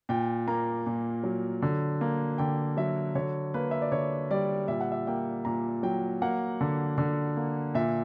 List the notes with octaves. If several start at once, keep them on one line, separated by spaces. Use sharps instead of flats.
A#2 G5
A#3 A#5
A#2
F#3
D3
A#3
D3 G5
F#3 E5
D3 C#5
A#3 B4
E5
D5
D3 C#5
G3 D5
A#2 E5
F#5
E5
A#3 G5
A#2 A#5
F#3 G5
A#3 F#5
D3
D3
A#3
A#2 E5